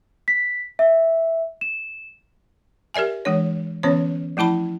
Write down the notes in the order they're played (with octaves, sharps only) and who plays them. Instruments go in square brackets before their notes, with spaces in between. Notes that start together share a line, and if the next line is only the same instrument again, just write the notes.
[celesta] B6
E5
E7
[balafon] G4 A#4 D5 E5 G#5
E3 G#3 D4 C#5
D3 E3 B3 C#4 C5 C#5
F3 A3 E4 A5 B5